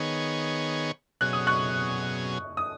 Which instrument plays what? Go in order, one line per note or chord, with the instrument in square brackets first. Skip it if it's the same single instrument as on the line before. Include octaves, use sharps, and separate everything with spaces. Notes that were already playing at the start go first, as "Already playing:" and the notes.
Already playing: [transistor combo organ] D#3 B3 G#4 C#5
[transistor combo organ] B2 F#3 C#4 G#4 [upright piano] F#6
[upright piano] D#6
C#6 F#6
D#6